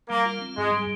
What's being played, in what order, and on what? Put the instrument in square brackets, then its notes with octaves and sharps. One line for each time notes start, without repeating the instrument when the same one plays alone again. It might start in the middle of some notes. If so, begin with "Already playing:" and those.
[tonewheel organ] G3 [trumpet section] A#3
[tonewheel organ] F4
C4
[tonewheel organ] G#2 [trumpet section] G#3
[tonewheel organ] G3